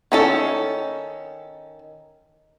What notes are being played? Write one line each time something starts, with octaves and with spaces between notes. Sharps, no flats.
D#3 C#4 A4